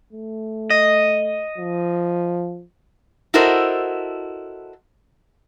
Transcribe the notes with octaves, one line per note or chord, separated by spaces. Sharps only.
A3
D#5
F3
E4 F#4 A4 A#4 C5 D#5